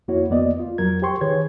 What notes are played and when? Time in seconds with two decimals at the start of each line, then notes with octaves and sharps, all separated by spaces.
0.08 F2 A#3 E4 F#4 C#5
0.30 F2 A#3 B3 D5 D#5
0.60 F4
0.78 F2 F#3 A#4 G#6
1.02 G4 C5 G5 C6 C#6
1.21 D#3 G#4 B4 C#5 G#6